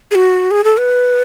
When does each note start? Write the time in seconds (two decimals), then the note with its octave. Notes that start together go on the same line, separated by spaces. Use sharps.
0.11 G#4
0.15 F#4
0.51 G#4
0.64 A4
0.78 B4